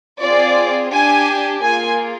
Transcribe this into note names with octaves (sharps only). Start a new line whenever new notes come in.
C4 F4 G#4 D5
D4 G4 G#5
A#3 F4 G#4 G#5